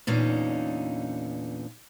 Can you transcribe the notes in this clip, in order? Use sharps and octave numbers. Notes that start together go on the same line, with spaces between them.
E2 A#2 D3 C#4 D#4